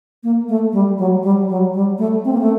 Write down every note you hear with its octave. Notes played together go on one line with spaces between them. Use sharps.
A#3
A3
G3
F#3
G3
F#3
G3
A3
C4
A#3
A3